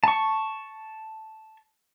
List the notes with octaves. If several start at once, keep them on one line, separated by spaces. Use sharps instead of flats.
A5 C#6